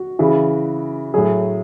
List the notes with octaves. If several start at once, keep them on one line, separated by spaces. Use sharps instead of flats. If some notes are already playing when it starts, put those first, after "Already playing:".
Already playing: F#4
C#3 E3
A2 F#3 G#4